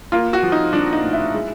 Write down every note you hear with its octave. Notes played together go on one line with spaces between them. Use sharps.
A#3 F4
F#4
F3
D#4
F3 D4
D#4
A2
E4
G#3